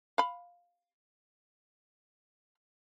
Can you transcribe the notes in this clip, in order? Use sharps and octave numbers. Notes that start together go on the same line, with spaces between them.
F5 B5